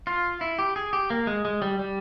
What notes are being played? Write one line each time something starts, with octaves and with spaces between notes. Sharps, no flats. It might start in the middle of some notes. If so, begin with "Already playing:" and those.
F4
E4
G4
G#4
G4
A#3
G#3
G#3
G3
G3